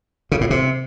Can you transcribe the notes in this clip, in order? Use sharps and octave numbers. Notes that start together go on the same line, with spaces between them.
C#3
A2
C3